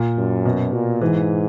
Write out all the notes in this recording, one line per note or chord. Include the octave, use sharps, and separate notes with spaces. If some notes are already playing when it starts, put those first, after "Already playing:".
Already playing: A#2
F#2
B2
A#2
G#2 E3